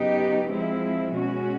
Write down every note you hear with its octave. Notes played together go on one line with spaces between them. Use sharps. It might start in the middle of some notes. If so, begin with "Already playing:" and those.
Already playing: C#3 F#3 B3 D#4 G4
F3 G#3 C4 E4
B2 G#3 C#4 F#4